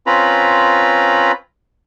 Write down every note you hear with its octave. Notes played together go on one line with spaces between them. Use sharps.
C4 C#4 F4 B4 A#5 B5